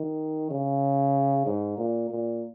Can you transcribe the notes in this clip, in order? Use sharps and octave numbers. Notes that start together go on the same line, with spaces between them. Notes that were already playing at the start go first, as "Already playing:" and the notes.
Already playing: D#3
C#3
G#2
A#2
A#2